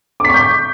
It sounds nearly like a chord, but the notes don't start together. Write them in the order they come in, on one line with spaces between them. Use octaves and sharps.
D6 B6 C#6 G6